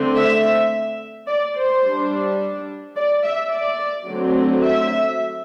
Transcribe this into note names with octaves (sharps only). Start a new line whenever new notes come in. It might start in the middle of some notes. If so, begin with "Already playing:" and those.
Already playing: D3 A3 C4
E5
D5
C5
G3 D4
D5
E5
D5
D3 F#3 A3 C4
E5